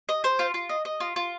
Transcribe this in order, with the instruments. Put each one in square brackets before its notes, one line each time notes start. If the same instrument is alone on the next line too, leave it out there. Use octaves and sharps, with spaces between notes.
[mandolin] D#5
C5
F4
F4
D#5
D#5
F4
F4